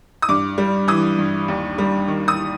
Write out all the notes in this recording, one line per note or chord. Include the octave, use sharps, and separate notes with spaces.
D#6
G2 D6
G3
E3 D#6
G2
D#2
G3
D#3
D#6